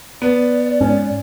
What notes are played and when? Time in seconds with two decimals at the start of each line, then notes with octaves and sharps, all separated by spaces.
0.22 B3 D5
0.81 G#2 C#4